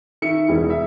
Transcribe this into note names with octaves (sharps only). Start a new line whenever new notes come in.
D#3 E5 C#7
E1 E3
E5